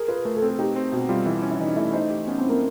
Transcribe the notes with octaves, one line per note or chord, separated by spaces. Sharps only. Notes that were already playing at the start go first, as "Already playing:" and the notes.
Already playing: G#4 A#4
F4 B4
A3 A#4
A4
C4
A4
D#4 G4
C4
B2 F#4
G3 F4
E3 E4
C#4
E4
E3 D#4
A3 E4
D#4 C5
G4
B3 C#4
C4
E4
A#3